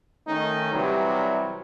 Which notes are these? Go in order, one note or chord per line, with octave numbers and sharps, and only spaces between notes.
D#3 A3 C#4 D#4
C3 E3 F#3 G3